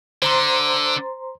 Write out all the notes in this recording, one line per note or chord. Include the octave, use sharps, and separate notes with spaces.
D3 C5 A#5 C6